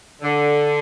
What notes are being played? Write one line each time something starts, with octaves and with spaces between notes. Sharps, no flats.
D3